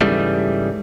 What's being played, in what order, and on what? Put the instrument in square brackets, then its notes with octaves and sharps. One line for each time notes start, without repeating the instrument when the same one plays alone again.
[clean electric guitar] G#2 C#3 E3 G3 A3